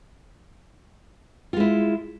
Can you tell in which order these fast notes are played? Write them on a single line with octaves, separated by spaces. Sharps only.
F4 G#3 E4